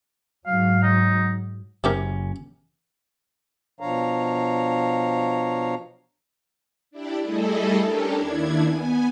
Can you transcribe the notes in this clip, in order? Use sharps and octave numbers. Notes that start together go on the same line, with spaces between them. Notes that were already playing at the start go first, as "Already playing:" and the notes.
G#2 F#3 F5
D#4
F#1 C3 C#4 G4 A#4
B2 F3 D4 C#5 F5 A#5
D4 E4 G4 D5
G3 A3 E4 G#4 A4 D#5
C#4 D4 G4 A4 A#4
D#2 D#3 D4 E4 G#6
B3 G#5